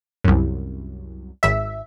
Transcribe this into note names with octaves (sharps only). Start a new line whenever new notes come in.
C2 F#2
G#1 E5